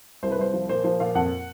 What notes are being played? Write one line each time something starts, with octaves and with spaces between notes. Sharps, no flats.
C2 C5
B4
C2 C5
F3
A#2 C5
F3 C5
A#2 F5
F2 F#5